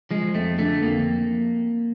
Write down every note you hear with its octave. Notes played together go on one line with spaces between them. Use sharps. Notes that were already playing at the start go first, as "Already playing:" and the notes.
F3 G#3
F2 A3
D3 A3
F2 A#3